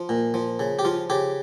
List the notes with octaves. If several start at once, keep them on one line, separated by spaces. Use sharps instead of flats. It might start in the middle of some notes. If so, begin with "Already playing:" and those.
Already playing: F3
A#2
F3
C#3
G4
F3 F4
C#3 G4